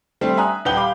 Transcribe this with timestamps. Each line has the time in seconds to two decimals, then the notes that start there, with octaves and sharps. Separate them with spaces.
0.21 G3 A3 C4
0.37 E5 G#5 A#5 D#6 F#6
0.65 D#1 G4 B4 F#5 G6 G7
0.77 F5 B5 D6